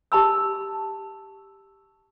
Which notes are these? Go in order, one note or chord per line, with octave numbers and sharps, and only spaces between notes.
G4 A5 B5 E6